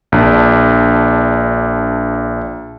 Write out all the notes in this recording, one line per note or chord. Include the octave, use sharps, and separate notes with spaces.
A#1 D4